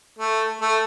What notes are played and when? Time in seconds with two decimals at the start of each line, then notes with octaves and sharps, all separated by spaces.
0.19 A3
0.61 A3